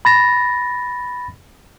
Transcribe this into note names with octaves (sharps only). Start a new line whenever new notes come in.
B5 A6 A#6